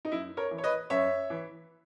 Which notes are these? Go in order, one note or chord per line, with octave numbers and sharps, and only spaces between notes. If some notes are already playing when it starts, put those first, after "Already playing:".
D#4
F#2 E4
A#4 C#5
E3
C#5
B4 D#5
F#2 C#5 E5
E3